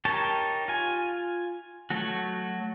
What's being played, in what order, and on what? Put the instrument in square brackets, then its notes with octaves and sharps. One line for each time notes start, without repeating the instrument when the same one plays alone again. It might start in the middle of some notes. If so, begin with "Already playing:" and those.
[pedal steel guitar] D#4 G4 A#4 C#5 A5
F4 G#5
F#3 A3 F#4